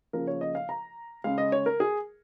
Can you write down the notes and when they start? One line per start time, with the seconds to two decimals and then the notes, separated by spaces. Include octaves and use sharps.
0.13 C#3 F3 A#3 A#4
0.27 C#5
0.41 D#5
0.55 F5
0.69 A#5
1.24 C#3 G#3 F5
1.38 D#5
1.52 C#5
1.66 A#4
1.80 G#4